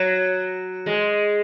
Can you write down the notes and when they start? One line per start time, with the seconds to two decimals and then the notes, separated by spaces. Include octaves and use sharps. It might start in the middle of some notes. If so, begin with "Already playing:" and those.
Already playing: F#3
0.86 G#3